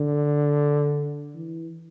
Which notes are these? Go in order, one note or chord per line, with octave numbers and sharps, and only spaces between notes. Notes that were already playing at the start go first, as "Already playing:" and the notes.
Already playing: D3
E3